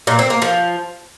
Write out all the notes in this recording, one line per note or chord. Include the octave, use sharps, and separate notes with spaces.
A#2
C4
A#3
F3